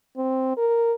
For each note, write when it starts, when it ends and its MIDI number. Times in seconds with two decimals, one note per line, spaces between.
0.17 0.54 60
0.57 0.93 70